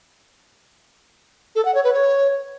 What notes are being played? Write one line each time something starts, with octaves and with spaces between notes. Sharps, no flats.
A4
F#5
C#5
B4
C#5